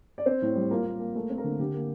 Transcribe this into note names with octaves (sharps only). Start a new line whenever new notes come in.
D5
C4 C5
A2
G3
A#3 F4 A#4
A#3
A#3
A3 A#3 A#4
C4
A#3 A#4
D3
D3 G4
A#3